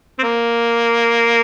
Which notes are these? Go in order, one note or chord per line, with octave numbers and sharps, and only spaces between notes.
C4
A#3